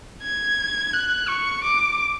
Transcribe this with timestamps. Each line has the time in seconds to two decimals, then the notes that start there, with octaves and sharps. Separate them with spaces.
0.23 G#6
0.94 F#6
1.28 C#6
1.64 D6